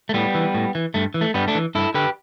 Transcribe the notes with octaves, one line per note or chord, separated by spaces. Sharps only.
A3
A2 G3 B3
E3
A2
E3
G2 A3
E3
A3
G2 G3 B3
A3 D4
E3
G2 E4 A4
D3 G4 B4